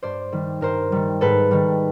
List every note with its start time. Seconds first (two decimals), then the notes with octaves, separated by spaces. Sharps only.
0.03 G2 C5 D5
0.32 D#3 G3
0.61 G2 A#4 C5
0.92 D#3 G3
1.21 G#2 A4 B4
1.51 D#3 G3